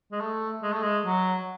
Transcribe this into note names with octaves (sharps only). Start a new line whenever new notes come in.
G#3
A3
G#3
A3
G#3
F#3